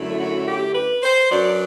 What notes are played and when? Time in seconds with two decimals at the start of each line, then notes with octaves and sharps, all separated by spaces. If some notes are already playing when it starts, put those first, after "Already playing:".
Already playing: F#2 D3 F#3 A3 E4
0.19 F#4
0.47 G4
0.74 B4
1.02 C5
1.29 F#2 F#3 B3 D4 D5